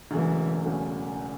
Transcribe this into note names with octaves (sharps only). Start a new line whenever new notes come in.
E1 E2 C#3 E3 F#3 A3
E1 E2 C#3 F#3 A3